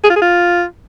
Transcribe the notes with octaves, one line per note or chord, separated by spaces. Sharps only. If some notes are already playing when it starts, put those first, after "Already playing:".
G#4
F4
G#4
F4